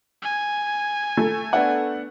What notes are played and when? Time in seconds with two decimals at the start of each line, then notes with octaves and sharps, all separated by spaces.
0.22 G#5
1.17 A3
1.53 B3 D4 F#5